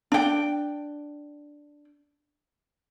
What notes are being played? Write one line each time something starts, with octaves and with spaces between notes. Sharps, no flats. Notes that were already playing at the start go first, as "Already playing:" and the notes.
D4 G5